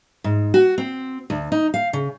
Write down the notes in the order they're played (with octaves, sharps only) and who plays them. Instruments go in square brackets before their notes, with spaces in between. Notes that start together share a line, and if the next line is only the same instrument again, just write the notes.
[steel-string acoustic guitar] G#2
F#4
C4
D2
D#4
F5
C#3